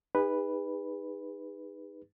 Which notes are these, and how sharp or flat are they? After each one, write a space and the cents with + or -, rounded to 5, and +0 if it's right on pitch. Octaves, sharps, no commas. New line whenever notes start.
D#4 +0 G#4 -40 B4 +0